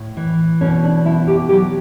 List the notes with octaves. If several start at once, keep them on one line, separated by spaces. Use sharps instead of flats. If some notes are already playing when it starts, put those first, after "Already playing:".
Already playing: A2
E3
B2 C#4
D4
B2 E4
G4
F#3 G4